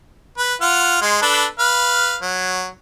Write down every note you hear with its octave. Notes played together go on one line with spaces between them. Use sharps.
B4
F4 F#5 F6
G#3 C6
D4 A4 B4
B4 F5
F#3